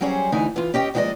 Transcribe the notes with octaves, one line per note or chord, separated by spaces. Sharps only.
F#3 G3 C#4 G#4 C5
D2 D3 E3 D#4 E4 G#5
E3 F4
C#4 G4 D#5 F#5 G5
D#2 F3 G#3 F#4 D5 D#5